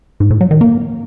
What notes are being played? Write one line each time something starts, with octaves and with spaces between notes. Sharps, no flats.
G#2
A2
F#3
D#3
A#3